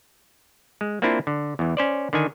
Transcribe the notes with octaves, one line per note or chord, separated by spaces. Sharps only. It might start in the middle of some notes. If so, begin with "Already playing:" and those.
G#3
A#3 C4 D4 E4 F4
D3
E2 E3
C#4 C5 D5
D3 D#3 G#5